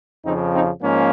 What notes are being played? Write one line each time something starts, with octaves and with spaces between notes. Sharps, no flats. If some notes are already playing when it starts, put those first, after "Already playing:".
F2 C#3 F3 C4 D#4
C4 D#4
G#2 F3 G#3 A#3 C#4